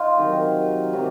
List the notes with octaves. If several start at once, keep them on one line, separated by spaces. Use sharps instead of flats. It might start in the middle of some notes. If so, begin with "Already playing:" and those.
Already playing: D#4 F4
C3 D#3 F#3
C3 D#3 F#3